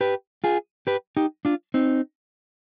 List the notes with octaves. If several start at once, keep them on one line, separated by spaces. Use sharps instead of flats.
G4 B4
F4 G#4
G4 B4
D#4 G4
D4 F4
C4 D#4